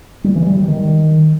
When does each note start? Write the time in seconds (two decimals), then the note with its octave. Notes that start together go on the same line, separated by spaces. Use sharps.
0.24 G3
0.35 E3
0.46 G3
0.57 G3
0.68 D#3